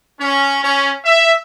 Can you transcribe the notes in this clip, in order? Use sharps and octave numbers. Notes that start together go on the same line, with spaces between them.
C#4
C#4
E5